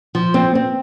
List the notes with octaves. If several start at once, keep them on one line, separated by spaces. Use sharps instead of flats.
F3
C4
C4